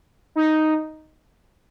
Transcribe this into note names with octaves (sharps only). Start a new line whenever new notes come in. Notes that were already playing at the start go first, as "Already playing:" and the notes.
D#4